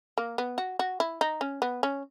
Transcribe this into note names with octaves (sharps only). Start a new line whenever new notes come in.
A#3
B3
F#4
F#4
E4
D#4
C#4
B3
C#4